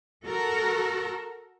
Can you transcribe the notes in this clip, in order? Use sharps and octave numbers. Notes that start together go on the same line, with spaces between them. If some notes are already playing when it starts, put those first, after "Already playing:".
F#4 A4 A#4